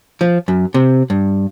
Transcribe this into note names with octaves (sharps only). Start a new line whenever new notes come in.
F3
F#2
C3
G2